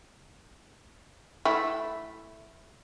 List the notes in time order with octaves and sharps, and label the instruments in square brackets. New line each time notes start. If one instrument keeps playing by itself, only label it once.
[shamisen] A3 E4